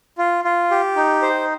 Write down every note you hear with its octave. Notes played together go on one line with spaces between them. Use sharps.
F4
F4
G4
D#4
C5